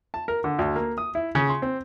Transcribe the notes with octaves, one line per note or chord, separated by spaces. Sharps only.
A5
A#4
D3
D2
A#3
D#6
E4
C#3
C6
C4